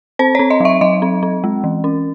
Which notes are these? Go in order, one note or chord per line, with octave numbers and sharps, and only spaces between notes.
C4 C5
C4 C#5
D#5
F#3 E5
F#3 D#5
C4
C4
G#3
E3
C#4